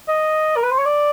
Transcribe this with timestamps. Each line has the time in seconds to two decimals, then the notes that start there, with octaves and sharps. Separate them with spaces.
0.08 D#5
0.56 A#4
0.63 B4
0.71 C5
0.78 C#5
0.85 D5